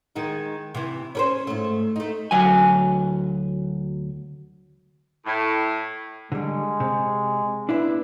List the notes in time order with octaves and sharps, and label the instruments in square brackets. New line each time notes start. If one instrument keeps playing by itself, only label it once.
[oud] D#3 G#3 D#4
C3 E3
C#4 A#4 C5
G#2 A3
A3 D#4
[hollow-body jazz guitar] D2 F#3 G#5
[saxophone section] A2
[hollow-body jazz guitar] D3 G3 [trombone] G#3
[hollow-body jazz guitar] C3
[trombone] B3 [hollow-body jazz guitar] D4 E4 E5